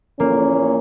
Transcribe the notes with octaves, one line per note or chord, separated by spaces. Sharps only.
E2 A#2 A#3 C#4